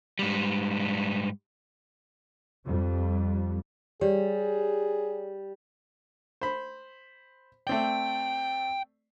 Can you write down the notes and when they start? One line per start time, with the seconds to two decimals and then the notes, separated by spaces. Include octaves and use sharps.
0.19 G#2 G3
2.66 F2 G3
4.01 G3 G4 G#4 C#5 D5
6.41 C5 B5
7.67 A3 C4 D5 G5